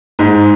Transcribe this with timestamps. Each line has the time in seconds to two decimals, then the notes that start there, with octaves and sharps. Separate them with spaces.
0.19 G#2